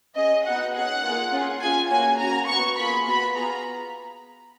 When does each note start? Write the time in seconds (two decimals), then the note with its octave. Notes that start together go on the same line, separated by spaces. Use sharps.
0.15 C#4 G#4 D#5
0.45 B3 D#4 F#4 F#5
0.73 C#4 G#4 F#5
1.02 A#3 F4 G#4
1.32 C#4 F4 G#4
1.60 C#4 F4 G#4 G#5
1.89 A#3 C#4 F#4 G#5
2.18 C#4 F#4 A#5
2.47 B3 F#4 C#6
2.77 A#3 F4 G#4 B5
3.06 B3 F#4 B5
3.35 B3 F4 G#4 A#5